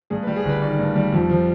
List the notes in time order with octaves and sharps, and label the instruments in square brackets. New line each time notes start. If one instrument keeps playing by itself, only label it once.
[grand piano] G2 G#4
B4
G3
G#4
G1 B4
D#3 D5
G2
G3
F2
F3